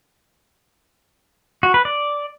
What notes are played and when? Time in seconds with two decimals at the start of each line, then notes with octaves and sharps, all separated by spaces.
1.63 F#4
1.74 B4
1.85 D5